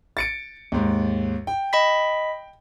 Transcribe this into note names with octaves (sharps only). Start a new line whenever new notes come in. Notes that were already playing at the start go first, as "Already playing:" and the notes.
A6 C#7 D7
D#2 G#2
G5
D#5 B5 B6